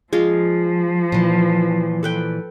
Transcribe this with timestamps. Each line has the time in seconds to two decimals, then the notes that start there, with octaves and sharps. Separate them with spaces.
0.13 F3 G#3 F4
1.12 A#2 E3
2.03 A4 B4 G5